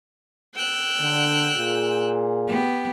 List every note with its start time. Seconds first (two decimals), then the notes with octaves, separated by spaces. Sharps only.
0.54 G5 E6 F#6
1.00 D3
1.57 A#2 F4 G#4
2.47 B3 G4